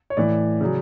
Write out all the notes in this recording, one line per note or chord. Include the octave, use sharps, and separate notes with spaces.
C#5
A2 E3 D5
C#3 F#3